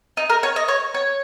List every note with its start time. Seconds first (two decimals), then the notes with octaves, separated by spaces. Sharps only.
0.17 D#4
0.30 A#4
0.43 C#5
0.56 D#5
0.68 C#5
0.94 C#5